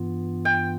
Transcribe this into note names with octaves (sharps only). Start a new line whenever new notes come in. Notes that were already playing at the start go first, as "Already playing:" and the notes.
Already playing: G2 E3 B3 F4
G5